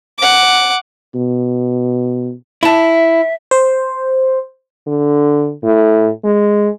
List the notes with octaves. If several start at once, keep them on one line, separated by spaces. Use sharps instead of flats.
F#5 D6
B2
E4 E5 A5
C5
D3
A2
G#3